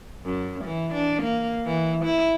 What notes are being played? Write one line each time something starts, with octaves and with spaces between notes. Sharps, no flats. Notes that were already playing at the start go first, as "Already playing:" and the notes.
F#2
E3
D4
A#3
E3
E4